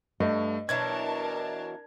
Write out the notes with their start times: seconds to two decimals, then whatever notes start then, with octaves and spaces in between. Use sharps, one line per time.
0.20 G2 A3 D#5
0.69 B2 E3 F#3 D4 A#4 A5 G#6